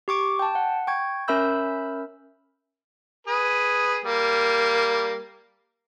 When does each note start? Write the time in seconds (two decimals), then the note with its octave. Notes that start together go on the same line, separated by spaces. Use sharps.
0.08 G4 C#6 D6 D7
0.39 G5 A5
0.55 F#5
0.87 G5 C#6 G#6
1.28 C#4 A#4 E5 B5 E6 G6
3.27 G#4 B4
4.05 G3 A#3